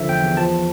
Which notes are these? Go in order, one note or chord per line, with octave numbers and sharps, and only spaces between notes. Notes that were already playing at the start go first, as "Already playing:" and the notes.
Already playing: D3 F3 E5
E2 G5
E2
F3 A5